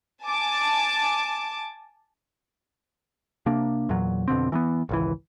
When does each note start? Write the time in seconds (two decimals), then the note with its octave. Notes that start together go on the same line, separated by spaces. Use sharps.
0.24 G#5 A5 D6
3.46 C3 A#3 D4
3.89 E2 A#2 F#3
4.28 F2 B2 D3 C4
4.52 E3 A#3 B3
4.89 G#1 C#2 E3